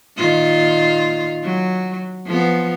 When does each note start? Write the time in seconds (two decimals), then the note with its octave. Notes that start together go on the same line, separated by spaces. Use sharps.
0.17 A#2 D#3 F4
1.43 F#3
2.26 F3 B3